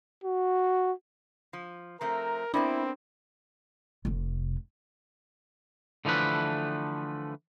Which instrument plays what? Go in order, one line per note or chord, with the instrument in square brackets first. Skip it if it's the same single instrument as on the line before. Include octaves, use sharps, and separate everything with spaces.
[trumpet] F#4
[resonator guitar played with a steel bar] F3
[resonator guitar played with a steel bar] F3 A3 C4 [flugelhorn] A#4 [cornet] A#5
[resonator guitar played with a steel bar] B3 A#4 D5 [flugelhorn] C4 [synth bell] D4 [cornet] E4
[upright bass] F1 C3
[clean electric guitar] D3 E3 F3 A3 B4